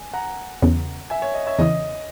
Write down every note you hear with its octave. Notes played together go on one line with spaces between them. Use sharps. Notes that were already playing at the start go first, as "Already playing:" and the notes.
Already playing: G#5
F#5 A#5
E2 C#3 E3 B3
E5 G#5
C#5
D#5
C#5 E5
E2 C#3 E3 D#5